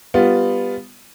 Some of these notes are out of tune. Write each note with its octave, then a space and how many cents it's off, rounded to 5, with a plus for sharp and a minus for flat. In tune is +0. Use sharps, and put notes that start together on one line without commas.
G3 +15 B3 +0 F4 +0